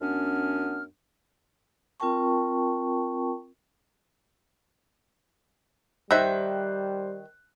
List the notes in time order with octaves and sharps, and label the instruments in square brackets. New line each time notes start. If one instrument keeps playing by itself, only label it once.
[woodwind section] F#2 B3 C#4 D4 F6
[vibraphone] C4 F4 A#4 G5 A5 C#6
[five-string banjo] D#3 E5 [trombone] G3 [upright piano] C5 F#6